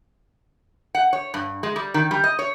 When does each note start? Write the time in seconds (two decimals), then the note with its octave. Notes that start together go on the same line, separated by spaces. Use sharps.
0.95 F#5
1.13 C#5
1.34 G2
1.63 G#3
1.76 G3
1.94 D#3
2.11 G3
2.24 D#5
2.39 C#5